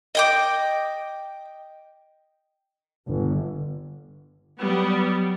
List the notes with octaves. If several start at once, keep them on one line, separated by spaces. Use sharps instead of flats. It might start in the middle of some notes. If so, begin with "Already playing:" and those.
D#5 G5 D6
G1
F#3 G3 B3